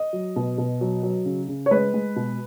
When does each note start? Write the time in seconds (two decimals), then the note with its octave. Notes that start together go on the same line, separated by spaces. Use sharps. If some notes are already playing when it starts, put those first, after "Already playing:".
Already playing: D#5
0.13 F#3
0.36 B2
0.58 B2
0.81 F#3
1.03 F#3
1.25 C#3
1.48 C#3
1.66 C#5
1.71 G#3 B4
1.94 G#3
2.16 B2